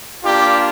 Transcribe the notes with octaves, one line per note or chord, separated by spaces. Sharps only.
A#3 D4 F4 G4